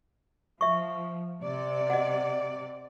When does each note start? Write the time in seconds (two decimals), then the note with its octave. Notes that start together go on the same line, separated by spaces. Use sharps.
0.61 F3 E5 C#6
1.43 C3 D5
1.90 D#5 F#5